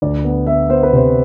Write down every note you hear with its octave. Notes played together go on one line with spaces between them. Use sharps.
D2 D5
B3
B3 E5
B3 C5
B4
C3 C5